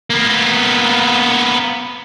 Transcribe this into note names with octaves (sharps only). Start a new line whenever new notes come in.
A#3 B3